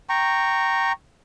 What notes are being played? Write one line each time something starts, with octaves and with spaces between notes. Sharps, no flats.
G5 A#5 C#6